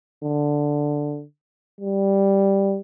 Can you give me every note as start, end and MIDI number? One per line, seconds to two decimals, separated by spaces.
0.24 1.23 50
1.81 2.79 55